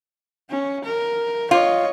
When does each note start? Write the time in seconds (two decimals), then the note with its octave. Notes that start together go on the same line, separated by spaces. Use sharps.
0.49 C#4
0.85 A#4
1.51 F4 C#5 D#5